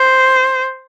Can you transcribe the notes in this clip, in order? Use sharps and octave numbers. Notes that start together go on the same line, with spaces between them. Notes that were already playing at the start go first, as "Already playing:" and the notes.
Already playing: C5